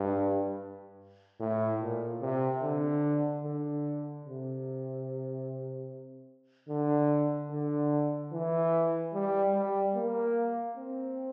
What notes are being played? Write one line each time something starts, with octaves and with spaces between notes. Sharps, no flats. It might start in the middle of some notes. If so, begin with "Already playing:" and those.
Already playing: G2
A2
A#2
C3
D3
D3
C3
D3
D3
E3
G3
G3
A#3
C4